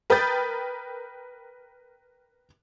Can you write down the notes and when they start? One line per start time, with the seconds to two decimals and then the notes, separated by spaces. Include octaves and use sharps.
0.10 A#4 B4 G5 D#6 G6 A6